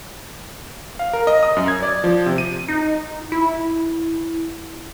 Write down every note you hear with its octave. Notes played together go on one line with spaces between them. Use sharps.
F5
A#4
D#5
D#6
F#2
G#6
D5
F3
C3
D#7
D#4
E4